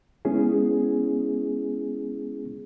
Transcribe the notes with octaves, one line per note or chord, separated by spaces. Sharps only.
G#3 B3 C#4 E4 G#4